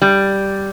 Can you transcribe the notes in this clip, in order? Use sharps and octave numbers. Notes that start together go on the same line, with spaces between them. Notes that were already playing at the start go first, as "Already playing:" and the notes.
G3